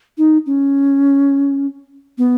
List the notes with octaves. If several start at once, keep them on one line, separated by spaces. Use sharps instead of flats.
D#4
C#4
B3